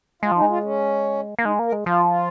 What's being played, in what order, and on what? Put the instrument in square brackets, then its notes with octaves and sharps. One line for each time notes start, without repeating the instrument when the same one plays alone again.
[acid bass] G#3 [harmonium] F4
[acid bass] F3 [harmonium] D#4
[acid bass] G#3
[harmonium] F4
C#4
[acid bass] A#3
[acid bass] G#3 [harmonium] D#4
[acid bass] A#3
[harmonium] A#4
[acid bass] G#3
[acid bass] F3 [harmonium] F4
[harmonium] F4